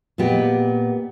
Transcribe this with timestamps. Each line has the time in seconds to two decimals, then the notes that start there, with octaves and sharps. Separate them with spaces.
0.18 A#2 G#3 B3 G4